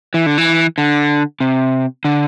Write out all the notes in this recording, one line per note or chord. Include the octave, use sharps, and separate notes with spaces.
E3
D3
E3
D3
C3
D3